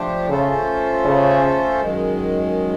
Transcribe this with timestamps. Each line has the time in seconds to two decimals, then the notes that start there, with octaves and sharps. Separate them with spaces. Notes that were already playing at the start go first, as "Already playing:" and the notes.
Already playing: F3 A3 D4 G4 C5
0.29 C#3 A3 C#4 F4 A4 C5
1.05 C#3
1.80 F#2 D#3 G#3